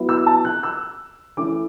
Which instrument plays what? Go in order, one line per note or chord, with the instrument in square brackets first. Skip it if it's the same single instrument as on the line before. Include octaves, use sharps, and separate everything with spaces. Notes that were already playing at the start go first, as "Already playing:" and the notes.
Already playing: [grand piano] F#3 B3 E4
E6
A5
F#6
E6
E3 A3 C#4 E4 D6